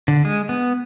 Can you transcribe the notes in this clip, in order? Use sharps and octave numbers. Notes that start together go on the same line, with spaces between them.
D3
G#3
B3